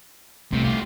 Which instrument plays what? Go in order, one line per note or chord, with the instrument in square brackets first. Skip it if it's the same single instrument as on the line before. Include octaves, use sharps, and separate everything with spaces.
[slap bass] C2 A3 [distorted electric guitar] C3
[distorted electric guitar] F4 G4